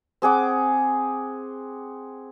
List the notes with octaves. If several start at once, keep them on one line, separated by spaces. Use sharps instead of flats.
C4 G#4 F#5 D6